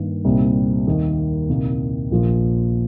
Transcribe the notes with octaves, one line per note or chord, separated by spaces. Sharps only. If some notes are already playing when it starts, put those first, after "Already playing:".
Already playing: G2 D#3 A#3
C2 A#2 G3 C4 D#4
D#2 D#3 A#3 D#4
C2 A#2 A#3 D#4
A#1 A#2 F3 A#3